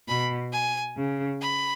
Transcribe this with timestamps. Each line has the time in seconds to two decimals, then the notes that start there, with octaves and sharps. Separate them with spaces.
0.08 B2 B5
0.53 G#5
0.97 C#3
1.42 B5